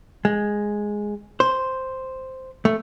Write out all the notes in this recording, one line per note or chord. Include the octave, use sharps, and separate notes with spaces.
G#3
C5
A3